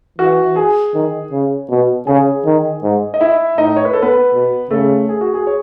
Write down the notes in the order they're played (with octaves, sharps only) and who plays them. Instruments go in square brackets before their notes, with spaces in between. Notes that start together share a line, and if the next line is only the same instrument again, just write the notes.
[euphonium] E3 [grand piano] F#4 F#5
[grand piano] G#4 G#5
[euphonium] D#3
C#3
B2
[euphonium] C#3 [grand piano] G#4 G#5
[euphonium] D#3
G#2
[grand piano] D#5
E4 E5
[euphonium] A2 [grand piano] D#4 D#5
[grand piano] C#5
B4
A4
B3 B4
[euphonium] B2
[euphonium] C#3 [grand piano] A3 A4
[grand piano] G#4
F#4
G#4
C#5